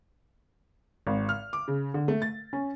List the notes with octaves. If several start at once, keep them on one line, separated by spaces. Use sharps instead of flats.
G#1
F6
D6
C#3
D3
A3
A6
C#4